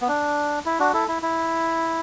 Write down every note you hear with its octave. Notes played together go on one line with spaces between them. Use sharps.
B3
D4
E4
D4 F#4
E4 A4
E4
E4